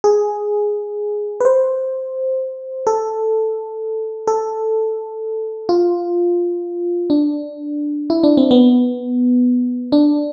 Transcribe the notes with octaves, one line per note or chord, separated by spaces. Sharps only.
G#4
B4
C5
A4
A4
F4
D4
E4
D4
C4
B3
D4